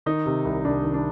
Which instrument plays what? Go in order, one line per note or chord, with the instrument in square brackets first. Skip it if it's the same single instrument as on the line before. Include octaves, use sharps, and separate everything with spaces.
[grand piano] D#3 D#4
C3
C2
C2 D4
D#3
D4